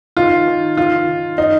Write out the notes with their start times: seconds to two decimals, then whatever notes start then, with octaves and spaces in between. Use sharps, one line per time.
0.17 D#3 F4
0.48 D#3
0.77 D#3 F4
1.07 D#3
1.38 D#4